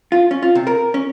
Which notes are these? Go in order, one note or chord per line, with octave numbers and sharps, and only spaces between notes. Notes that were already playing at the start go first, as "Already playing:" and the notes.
F4
C#4
F4
C3
A#4
C#4